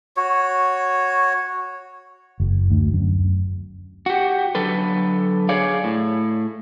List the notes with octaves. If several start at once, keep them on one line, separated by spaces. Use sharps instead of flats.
F#4 C#5
F#1
D2
F#2
F#4 G4
D3 F#3 A4 B4
G#4 C#5 D5 F5
A2